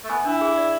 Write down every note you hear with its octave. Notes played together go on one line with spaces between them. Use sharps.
A3
B3 G#5
D4 E4
G#4
D5